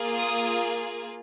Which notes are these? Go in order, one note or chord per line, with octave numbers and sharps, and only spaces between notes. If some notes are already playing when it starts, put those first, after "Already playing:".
Already playing: A#3 F4 G#4
D#6